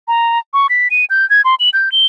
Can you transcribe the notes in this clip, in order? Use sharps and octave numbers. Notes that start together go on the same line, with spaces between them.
A#5
C#6
B6
D#7
G6
G#6
C6
F#7
G6
G7